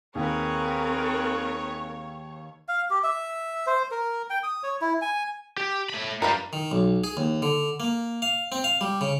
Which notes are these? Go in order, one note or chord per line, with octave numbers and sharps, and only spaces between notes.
D#2 C4 G#4 A#4 B4 C#5
F5
G4
E5
C5
A#4
G5
D#6
C#5
E4
G#5
G4
A3 B5
G2 G3 A#4 B4 F5
D#3
B1
G#4
D#2
D3
A#3
F5
C4
F5
G3
C#3